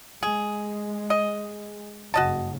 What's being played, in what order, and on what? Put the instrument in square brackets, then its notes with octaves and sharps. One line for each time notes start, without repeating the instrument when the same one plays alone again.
[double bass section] G#3 [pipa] G#4
[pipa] D#5
[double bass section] F#1 G2 C#3 [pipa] F#4 D#5 A5